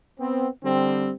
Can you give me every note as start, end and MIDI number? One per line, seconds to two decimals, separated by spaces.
0.20 0.48 59
0.20 0.48 60
0.64 1.12 50
0.64 1.12 55
0.64 1.12 60